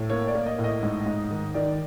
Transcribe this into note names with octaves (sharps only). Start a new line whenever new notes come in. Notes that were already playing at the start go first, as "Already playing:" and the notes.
Already playing: A2
A#3 C#5
D5
A#3
D#5
A2
D#5
G#2
G#2
D#3
D#3 D5